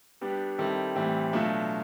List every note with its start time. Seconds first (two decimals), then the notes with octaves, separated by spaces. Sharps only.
0.21 G3 B3 D4 G4
0.58 D#3 G3 C4 E4 A4
0.95 A2 E3 G3 C4
1.33 B2 F#3 A3 D4 F4